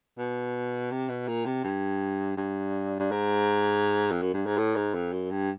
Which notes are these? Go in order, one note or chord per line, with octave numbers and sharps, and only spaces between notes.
B2
C3
B2
A#2
C3
G2
G2
G2
G#2
F2
F#2
G2
G#2
A2
G#2
F2
F#2
G2